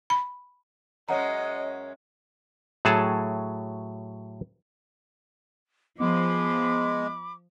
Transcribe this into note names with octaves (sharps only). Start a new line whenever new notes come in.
B5
F#2 G#3 C#4 C#5 D#5 F#5 A#5
A2 F#3 G#4 A4 A5
F3 G#3 B3 B5 D6